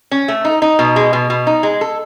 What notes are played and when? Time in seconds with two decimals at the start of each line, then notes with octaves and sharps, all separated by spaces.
0.12 C#4
0.28 A3
0.45 D#4
0.62 D#4
0.79 B2
0.96 G#3
1.13 B2
1.30 B2
1.47 D#4
1.63 G#3
1.81 A4